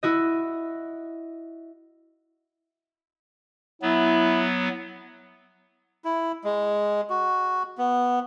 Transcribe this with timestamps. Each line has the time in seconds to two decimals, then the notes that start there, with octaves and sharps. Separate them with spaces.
0.03 E4 F#4 D#5
3.82 F#3 B3 E4
6.05 E4
6.44 G#3
7.10 F#4
7.78 B3